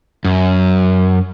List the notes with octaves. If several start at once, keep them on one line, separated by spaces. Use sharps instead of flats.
F#2